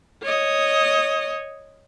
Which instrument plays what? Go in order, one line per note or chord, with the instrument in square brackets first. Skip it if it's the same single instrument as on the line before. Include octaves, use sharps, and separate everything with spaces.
[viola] C#5 D#5